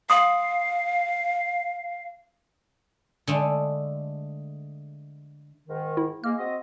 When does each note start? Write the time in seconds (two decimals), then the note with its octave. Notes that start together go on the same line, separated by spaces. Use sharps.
0.10 F5 C6 D#6
3.27 D3 G#3 A3
5.68 G#2 D#3
5.97 E4
6.24 G#3 A#3 F6
6.38 C4 F#4 D#5